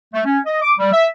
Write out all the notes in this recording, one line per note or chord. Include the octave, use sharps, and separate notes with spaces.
A3
C#4
D#5
D6
G3
E5